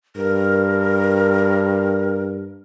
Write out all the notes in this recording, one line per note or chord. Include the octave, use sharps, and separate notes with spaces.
G2 A#4